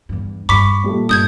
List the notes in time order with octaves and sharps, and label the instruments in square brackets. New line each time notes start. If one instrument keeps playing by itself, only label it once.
[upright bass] E2 G2
[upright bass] G2 [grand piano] B5 C#6 [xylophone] D6 B6
[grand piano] A#2 G3 A3
[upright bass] G2 [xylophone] D#6 G6 G#6